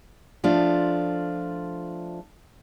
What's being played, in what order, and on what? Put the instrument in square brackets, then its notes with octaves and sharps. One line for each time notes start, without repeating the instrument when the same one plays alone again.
[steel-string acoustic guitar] F3 A3 D4 F4